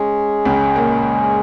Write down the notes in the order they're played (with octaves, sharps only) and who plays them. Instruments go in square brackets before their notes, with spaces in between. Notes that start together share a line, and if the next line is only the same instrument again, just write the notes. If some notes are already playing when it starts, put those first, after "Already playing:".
Already playing: [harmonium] G#3 C#4 G#4
[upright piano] C#2 C#3
A#2 A#3